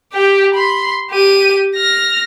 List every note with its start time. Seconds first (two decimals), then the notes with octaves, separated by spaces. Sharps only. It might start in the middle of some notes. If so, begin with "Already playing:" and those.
0.13 G4 G5
0.54 B5 C6
1.10 G4 D#7
1.76 F6 A#6